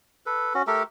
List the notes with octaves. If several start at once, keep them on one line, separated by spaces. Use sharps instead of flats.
A4 B4
C#4 F#4
A3 G4 A4 A#4